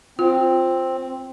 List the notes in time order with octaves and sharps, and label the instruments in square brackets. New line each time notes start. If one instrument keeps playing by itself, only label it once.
[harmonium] C4 [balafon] F4